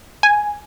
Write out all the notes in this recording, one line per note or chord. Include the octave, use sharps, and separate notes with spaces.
G#5